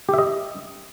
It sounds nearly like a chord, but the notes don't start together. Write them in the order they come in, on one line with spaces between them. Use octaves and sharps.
G4 E5 D#5